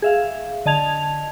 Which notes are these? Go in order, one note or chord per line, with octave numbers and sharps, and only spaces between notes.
G#4 E5 F5
D3 D#5 A5 G#6 F7